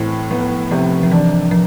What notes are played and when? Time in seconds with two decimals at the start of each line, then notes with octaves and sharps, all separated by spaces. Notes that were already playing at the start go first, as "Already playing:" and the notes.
Already playing: A2 E3 C4
0.31 F3 B3
0.71 C3 F3
1.03 F3
1.11 E3 D4
1.51 F3